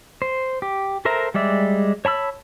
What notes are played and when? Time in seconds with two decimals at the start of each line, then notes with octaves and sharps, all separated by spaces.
0.22 C5
0.62 G4
1.05 A4 A#4 C5 E5 A#5
1.34 G3 G#3 D5 E5
2.05 C#5 A5 B5 E6